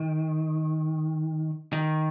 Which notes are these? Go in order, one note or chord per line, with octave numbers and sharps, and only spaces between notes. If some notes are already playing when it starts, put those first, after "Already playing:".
Already playing: D#3
D#3